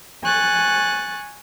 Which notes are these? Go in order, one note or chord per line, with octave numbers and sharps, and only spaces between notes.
G#5 C#6 F#6 A6